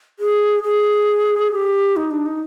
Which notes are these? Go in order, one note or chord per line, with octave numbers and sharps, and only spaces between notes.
G#4
G#4
G4
D#4
D4
D#4